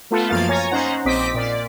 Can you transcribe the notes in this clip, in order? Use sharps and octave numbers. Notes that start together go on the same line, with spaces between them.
A3 B3 F4 A4
F#2 F3 A#3 F5 A6
C#5 G#5 A#5
C#4 D#4 C5 F#5 A#5
A#1 C4 D#5 D6 B6
A#2 D5